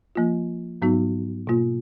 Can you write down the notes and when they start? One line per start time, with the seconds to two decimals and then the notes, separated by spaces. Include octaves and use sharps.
0.15 F3 A#3 F4
0.82 G#2 F#3 B3 D#4 F#4
1.47 B2 A#3 F4